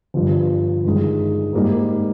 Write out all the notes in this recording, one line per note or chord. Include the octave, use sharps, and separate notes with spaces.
G1 G2 F3
G1 G2 D#3 G#3
G#2 G3 A#3 D#4